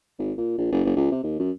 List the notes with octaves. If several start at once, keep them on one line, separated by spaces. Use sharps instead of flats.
G#1
A#2
A#1
F#1
F#1
C#2
C3
D#2
F#2